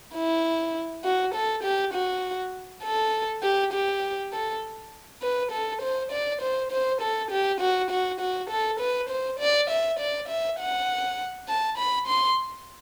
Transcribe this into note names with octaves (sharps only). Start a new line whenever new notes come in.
E4
F#4
A4
G4
F#4
A4
G4
G4
A4
B4
A4
C5
D5
C5
C5
A4
G4
F#4
F#4
F#4
A4
B4
C5
D5
E5
D5
E5
F#5
A5
B5
C6